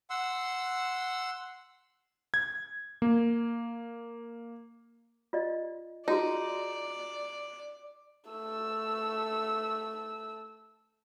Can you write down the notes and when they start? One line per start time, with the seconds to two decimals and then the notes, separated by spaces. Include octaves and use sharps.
0.10 F#5 C6 E6
2.34 G#6
3.02 A#3
5.33 F4 D5 D#5
6.08 D#4 F4 F#4 G#4 D5
8.30 A3 E6